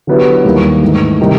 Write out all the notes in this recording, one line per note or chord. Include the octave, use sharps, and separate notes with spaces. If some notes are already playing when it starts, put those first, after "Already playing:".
D3 F#3 B3 E4 G4
D#2 D#3 G3 A#3
G#2 E3 A3
C3 D#3 G3